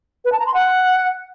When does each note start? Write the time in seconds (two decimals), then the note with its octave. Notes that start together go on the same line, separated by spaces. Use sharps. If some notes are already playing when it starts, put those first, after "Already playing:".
0.25 B4
0.32 A5
0.39 A#5
0.47 C6
0.54 F#5